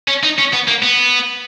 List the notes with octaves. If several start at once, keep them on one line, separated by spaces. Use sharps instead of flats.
C#4
D#4
C#4
B3
A#3
B3